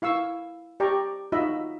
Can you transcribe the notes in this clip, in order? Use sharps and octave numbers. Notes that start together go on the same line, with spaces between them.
E4 F5 C#6 E6
G4 D5 G5 A#5 C#6
D#4 F4 F#4 D#5 E5 B5